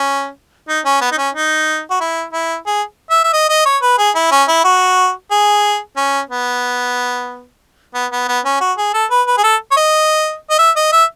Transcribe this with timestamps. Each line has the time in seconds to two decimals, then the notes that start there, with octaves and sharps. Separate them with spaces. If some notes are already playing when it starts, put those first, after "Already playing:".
Already playing: C#4
0.68 D#4
0.85 C#4
1.01 B3
1.11 D#4
1.18 C#4
1.34 D#4
1.90 F#4
2.00 E4
2.33 E4
2.66 G#4
3.10 E5
3.24 E5
3.33 D#5
3.49 D#5
3.65 C#5
3.82 B4
3.98 G#4
4.15 E4
4.31 C#4
4.48 E4
4.64 F#4
5.31 G#4
5.97 C#4
6.30 B3
7.95 B3
8.12 B3
8.28 B3
8.44 C#4
8.61 F#4
8.78 G#4
8.94 A4
9.10 B4
9.27 B4
9.37 G#4
9.44 A4
9.71 C#5
9.77 D#5
10.50 D#5
10.59 E5
10.76 D#5
10.92 E5